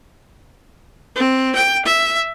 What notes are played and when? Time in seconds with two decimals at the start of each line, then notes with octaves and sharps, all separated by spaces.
1.16 C4
1.55 G5
1.85 E5